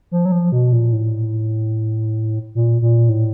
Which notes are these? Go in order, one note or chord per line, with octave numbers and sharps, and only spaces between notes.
F3
F#3
F3
B2
A#2
A2
A#2
A#2
A2